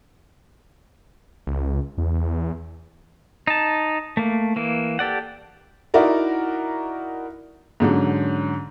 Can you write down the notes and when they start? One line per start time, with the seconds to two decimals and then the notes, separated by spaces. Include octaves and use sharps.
1.47 C#2
1.98 E2
3.47 D#4 A5
4.17 A3 A#3
4.56 E3 A#3
4.99 G4 A4 D5 F#5
5.94 D#4 E4 F#4 A#4 D5
7.80 G#2 D3 F#3 C#4